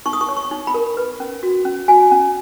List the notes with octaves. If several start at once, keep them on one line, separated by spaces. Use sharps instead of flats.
D#4 C#6
D#6
C#6
C#5
C#6
D#4
B5
A#4
B4
C#4
F#4
C#4
F#4 G#5
C#4